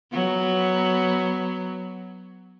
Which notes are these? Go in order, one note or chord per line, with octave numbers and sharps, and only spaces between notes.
F#3 B3